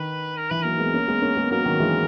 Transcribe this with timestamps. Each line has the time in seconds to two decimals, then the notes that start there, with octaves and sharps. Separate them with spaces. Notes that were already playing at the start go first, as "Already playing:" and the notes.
Already playing: D#3 B4
0.37 A#4
0.50 E3 B4
0.62 F#3 A#3 A#4
0.79 G#3 B3
0.94 A#3 C#4
1.08 G#3 B3
1.22 A#3 C#4
1.37 G#3 B3
1.51 F#3 A#3 A#4
1.65 D#3 F#3
1.80 E3 G#3